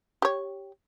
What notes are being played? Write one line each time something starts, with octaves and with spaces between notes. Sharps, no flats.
G4 C#5